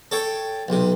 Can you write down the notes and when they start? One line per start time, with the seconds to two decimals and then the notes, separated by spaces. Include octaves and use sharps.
0.11 A4 C#5 G5
0.68 B1 C3